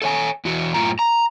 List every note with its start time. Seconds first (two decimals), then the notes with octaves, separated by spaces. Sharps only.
0.02 A4 C#5 G#5
0.45 E2 E3 F#4
0.74 F#2 A2 C3 G#3 F4 A#5
0.99 A#5